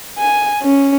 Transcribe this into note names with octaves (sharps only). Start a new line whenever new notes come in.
G#5
C#4